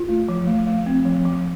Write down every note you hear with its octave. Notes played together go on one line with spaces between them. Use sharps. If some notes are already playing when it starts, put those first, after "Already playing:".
Already playing: F4
A3
F3
A3
A3
C4
F3
F3